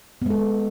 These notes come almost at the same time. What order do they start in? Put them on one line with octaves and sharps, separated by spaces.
B3 G#3 A4